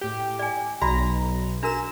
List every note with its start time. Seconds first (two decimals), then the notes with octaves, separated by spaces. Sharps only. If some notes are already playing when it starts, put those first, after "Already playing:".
0.01 A2 G4
0.39 D5 G#5
0.81 B1 F#4 D5 A#5 B5
1.63 D4 F#4 A#4 A#5 E7